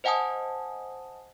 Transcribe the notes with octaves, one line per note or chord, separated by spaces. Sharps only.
C5 D#5 F#5 G#5 A5 D#6